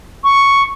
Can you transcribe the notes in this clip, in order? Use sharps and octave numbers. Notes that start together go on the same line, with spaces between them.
C#6